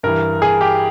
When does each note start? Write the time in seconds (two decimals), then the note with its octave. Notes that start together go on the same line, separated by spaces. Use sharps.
0.03 G2 E3 A#4
0.42 G#4
0.61 G4